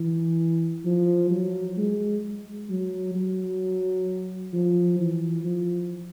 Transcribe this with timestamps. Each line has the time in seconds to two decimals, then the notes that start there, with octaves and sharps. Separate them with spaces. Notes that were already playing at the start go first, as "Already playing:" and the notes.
Already playing: E3
0.85 F3
1.31 F#3
1.77 G#3
2.69 F#3
3.15 F#3
4.53 F3
4.99 E3
5.45 F3